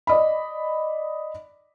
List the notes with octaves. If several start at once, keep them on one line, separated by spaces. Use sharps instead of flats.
D5 D#5 B5